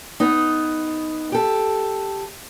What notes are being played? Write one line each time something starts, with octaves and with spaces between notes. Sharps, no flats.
B3 D#4
G4 A4